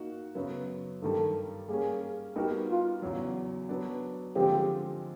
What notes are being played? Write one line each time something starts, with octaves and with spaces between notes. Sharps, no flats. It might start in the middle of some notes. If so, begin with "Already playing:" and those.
Already playing: A#3 D#4 F#4
F#2 C#3 F#3 B3
G2 D#3 G3 A4
G3 A#3 C#4 G#4
G3 B3 D#4 F#4 G4 A#4
F4
E2 C#3 F#3
F#3 B3 D4
D3 F3 G#3 C4 G4